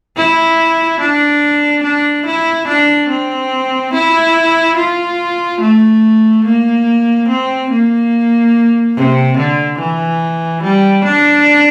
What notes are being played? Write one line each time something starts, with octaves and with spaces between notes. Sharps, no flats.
E4
D4
D4
E4
D4
C4
E4
F4
A3
A#3
C4
A#3
C3
D3
E3
G3
D4